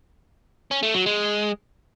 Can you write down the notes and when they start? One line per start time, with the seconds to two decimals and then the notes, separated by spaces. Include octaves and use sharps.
0.71 C#4
0.83 A3
0.94 F#3
1.06 G#3